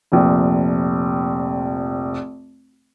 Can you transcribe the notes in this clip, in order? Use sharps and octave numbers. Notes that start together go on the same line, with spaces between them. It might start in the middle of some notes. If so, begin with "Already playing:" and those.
F1 A#1